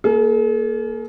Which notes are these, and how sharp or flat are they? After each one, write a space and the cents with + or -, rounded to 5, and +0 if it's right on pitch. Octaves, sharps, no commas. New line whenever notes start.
A#3 +0 G#4 +45